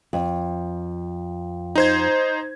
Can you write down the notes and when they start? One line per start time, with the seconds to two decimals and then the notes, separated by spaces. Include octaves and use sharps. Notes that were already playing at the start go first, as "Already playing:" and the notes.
0.13 F2
1.75 D#4 C5 G#6